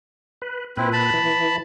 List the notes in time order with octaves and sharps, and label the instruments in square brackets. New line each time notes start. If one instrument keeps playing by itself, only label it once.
[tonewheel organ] B4
[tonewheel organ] A#2 B4 [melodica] C4 E4
[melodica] A5 B5
[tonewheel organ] E3